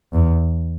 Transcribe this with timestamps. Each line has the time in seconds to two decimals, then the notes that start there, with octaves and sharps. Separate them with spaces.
0.13 E2